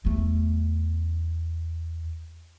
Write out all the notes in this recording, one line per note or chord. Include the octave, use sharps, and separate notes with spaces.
E2 A3